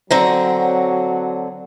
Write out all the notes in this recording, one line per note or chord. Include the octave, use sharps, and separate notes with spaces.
D3 F#3 C4 A#5